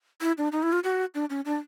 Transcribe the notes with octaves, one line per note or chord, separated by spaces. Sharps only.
E4
D4
D#4
E4
F4
F#4
D4
C#4
D4